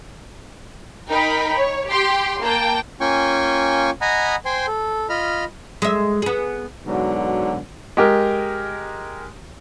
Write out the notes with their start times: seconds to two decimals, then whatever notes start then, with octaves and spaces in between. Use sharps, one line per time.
1.10 D#4 A#4 G5 B5
1.55 C#5
1.89 G4 G5 C6
2.41 A#3 G5 A5
3.01 A#3 C#4 F4 G5 G#5 C#6
4.01 D#5 F#5 G#5 A#5 B5 D#6
4.45 C5 G5 G#5 C6
4.68 A4
5.10 F4 D#5 B5 F6
5.82 G#3 E5
6.22 B3 G#4
6.86 G#2 B2 D3 F#3
7.97 G#3 G4 A#4